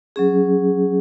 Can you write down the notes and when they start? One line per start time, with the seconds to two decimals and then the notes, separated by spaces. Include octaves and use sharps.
0.16 F#3 C#4 G#4